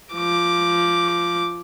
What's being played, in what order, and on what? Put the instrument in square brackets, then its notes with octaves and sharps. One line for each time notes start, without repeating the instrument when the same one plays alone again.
[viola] F3 D6